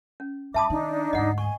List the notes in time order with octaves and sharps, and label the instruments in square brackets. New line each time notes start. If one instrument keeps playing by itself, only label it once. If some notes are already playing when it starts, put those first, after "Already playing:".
[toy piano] C#4
[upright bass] G2 [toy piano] E5 A5 D#6 [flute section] B5 D6
[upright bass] D#3 [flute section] D4 D#4
[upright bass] D2 G#2 [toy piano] D#5 F#5
[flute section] G#5 [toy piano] C#6